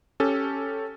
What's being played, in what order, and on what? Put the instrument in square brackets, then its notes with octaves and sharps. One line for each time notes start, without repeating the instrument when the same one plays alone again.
[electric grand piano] C#4 G4 A4 A6